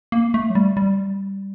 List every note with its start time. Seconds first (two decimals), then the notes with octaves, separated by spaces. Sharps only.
0.12 A#3
0.34 A3
0.50 F#3
0.55 G3
0.77 G3